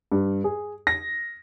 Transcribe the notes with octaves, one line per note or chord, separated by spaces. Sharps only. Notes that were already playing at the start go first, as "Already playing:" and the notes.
G2
G#4
A#6